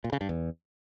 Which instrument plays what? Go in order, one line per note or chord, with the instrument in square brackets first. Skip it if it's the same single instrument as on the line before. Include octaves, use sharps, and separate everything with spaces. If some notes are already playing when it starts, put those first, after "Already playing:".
[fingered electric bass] A#2
C#3
G2
E2